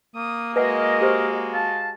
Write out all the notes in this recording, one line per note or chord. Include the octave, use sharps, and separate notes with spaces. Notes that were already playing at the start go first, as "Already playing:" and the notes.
A#3 D#6
G#3 F#4 A#4 B4 D#5 E5 F#5
G4 C5
F5 A5